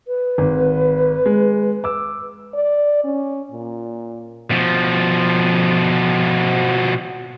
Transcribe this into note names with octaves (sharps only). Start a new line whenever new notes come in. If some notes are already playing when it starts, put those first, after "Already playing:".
B4
G#1
G#3
D6 E6
D5
C#4
A#2
B2 F3